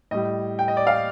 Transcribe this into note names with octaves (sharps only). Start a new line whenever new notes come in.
A2 G3 D#5
G5
D#5
D5
F5